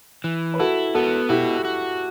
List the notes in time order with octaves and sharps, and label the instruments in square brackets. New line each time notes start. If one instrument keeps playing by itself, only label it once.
[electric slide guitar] E3
[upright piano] B4
[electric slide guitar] E4 [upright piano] F#4 A4
[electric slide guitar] B3 [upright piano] F#4 A4
[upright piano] E4 G4 [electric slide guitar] F#4
[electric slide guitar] F#4